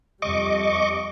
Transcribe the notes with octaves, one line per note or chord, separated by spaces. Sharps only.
F2 G3 D#5 C#6 D6